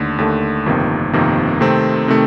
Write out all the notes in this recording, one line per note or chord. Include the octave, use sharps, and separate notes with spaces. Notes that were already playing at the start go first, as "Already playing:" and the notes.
Already playing: D#2 D3 A3
D#2 D3 A3
G1 F2 C3 D#3 A#3
G1 F2 C3 D#3 A#3
C3 D#3 A3 C4
C3 D#3 A3